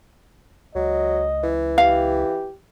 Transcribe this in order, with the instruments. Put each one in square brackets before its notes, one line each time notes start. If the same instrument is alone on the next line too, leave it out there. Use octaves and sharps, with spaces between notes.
[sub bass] C#2 [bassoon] F#3 [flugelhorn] D#5
[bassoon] E3
[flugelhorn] G4 [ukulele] F5